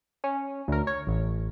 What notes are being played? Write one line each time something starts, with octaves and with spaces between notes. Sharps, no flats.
C#4
D2 A#4
C#5
A1